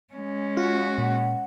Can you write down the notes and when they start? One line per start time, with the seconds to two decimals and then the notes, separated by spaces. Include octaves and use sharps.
0.14 G#3 C#4
0.57 F4 F#4
0.98 A#2 F#5